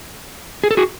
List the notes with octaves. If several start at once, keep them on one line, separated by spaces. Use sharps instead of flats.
G#4
A4
F#4 G#4